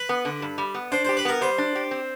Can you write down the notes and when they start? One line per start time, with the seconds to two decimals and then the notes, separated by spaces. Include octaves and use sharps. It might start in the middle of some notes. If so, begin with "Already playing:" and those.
Already playing: B4
0.09 B3
0.25 D3
0.42 G2
0.58 G3
0.75 B3
0.92 D4 C5
1.05 G4 C5
1.17 B4
1.25 B3 A#4
1.41 G3 C5
1.58 D4
1.75 G4
1.91 C4